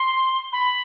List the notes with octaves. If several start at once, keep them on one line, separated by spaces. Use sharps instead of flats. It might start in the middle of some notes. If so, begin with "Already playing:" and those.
Already playing: C6
B5